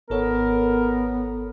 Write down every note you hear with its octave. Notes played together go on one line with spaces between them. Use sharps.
G#1 B3 A4 A#4 C#5